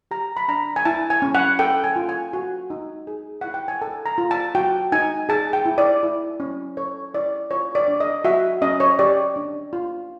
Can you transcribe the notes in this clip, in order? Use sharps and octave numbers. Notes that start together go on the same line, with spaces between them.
G4 A#5
B5
D4 A#5
G#5
E4 A5
G#5
C#4
F#5
A4 G5
G#5
F4
G#5
F#4
D#4
G#4
E4 F#5
G5
G#5
A4 A5
A#5
F4
A5
F#4 G5
D#4 G#5
G#4 A5
G5
E4
D5
E4
C#4
A4 C#5
E4 D5
F4 C#5
D5
D4
D#5
F#4 E5
C#4 D#5
C#5
G4 D5
D4
F4